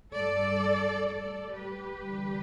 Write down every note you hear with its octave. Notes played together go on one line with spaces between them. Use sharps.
G2 G3 A4 D5
A2 G3 A4 D5
G4 B4
E2 D3 G3